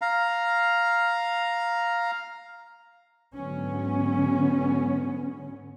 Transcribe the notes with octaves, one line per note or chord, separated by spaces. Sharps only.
F5 A#5
G#2 D3 F#3 B3 C#4